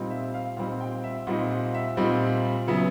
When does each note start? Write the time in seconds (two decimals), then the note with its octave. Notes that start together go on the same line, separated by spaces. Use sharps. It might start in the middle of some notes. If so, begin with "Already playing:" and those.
Already playing: A#2 G3 C4 D#4
0.10 E5
0.34 F5
0.57 A#2 G3 C4 D#4 F#5
0.81 G5
1.04 E5
1.27 A#2 G3 C4 D#4 F#5
1.51 F#5
1.74 E5
1.97 A#2 G3 C4 D#4
2.67 C#3 F#3 B3 E5